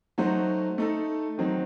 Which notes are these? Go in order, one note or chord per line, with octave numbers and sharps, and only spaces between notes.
F#3 A3 D#4 F#4 C5
A3 D#4 A4
D#3 F#3 C4 D#4